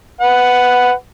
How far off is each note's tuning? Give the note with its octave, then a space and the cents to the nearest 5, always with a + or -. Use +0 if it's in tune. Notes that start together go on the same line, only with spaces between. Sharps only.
B4 +10 F#5 +0